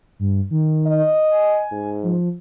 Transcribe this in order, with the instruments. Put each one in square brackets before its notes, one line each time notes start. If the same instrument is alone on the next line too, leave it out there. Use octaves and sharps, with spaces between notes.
[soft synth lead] G2
D#3
[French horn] D#5
[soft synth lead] G#5
[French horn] G#2
[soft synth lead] F3